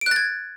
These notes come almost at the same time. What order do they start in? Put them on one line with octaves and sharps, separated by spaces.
D7 F#6 A6 G#6